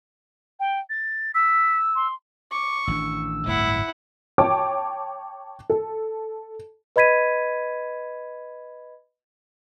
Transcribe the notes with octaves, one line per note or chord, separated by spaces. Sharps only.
G5
A6
E6 B6
C6
C#6 D6
A1 D#3 D4 E6
D1 G1 A2 E4 F#5
C#5 G5 A5 D6
A4
B4 D#5 B5 G#6 B6 D#7